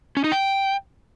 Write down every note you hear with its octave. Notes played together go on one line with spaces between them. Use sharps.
C#4
D#4
G5